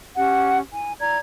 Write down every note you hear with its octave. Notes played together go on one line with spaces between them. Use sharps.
C#4 G4 F#5
E4 G#5
E4 D5 A#5 G#6